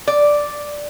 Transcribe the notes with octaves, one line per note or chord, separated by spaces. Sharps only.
D5